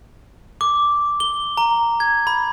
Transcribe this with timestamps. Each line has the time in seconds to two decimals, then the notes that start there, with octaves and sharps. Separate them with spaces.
0.61 D6
1.20 G7
1.57 A#5
2.00 G#6
2.27 B5